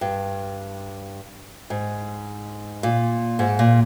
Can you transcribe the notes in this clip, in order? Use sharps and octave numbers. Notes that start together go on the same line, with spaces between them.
G2
G#2
A#2
G#2
A#2